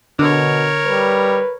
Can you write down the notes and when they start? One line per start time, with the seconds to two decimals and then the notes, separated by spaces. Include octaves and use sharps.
0.19 B2 D3 A#4 C#5
0.86 G3 B4